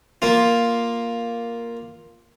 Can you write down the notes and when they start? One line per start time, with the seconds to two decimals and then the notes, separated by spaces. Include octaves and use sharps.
0.22 A#3 F4